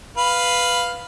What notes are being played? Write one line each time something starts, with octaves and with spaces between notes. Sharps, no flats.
B4 F5 B5